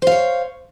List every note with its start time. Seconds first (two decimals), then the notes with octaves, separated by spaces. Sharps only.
0.02 C5
0.07 F5
0.12 C#5